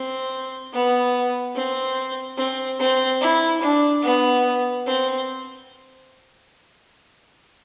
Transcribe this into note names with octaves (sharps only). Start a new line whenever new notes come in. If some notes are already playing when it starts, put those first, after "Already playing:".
Already playing: C4
B3
C4
C4
C4
E4
D4
B3
C4